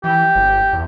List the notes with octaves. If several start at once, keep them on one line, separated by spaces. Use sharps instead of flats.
E3 G4
G1
E2